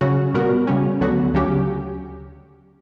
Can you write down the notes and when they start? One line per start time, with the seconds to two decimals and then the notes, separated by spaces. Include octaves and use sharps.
0.01 C#3 F#3 C#4 F#4
0.34 A#2 G3 B3 F#4 A#4
0.67 C#3 G3 C#4
1.00 D2 D3 F#3 B3 F#4
1.34 D2 C#3 F#3 C#4 G4